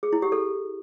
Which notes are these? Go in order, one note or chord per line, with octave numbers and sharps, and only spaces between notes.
G#4
E4
G4
A4